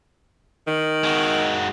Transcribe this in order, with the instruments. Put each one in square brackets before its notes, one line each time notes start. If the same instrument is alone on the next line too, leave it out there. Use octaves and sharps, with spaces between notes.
[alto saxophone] D#3
[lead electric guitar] G#3 F#4